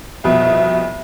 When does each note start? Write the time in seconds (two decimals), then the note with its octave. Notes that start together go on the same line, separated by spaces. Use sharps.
0.24 C2 F2 B2 E5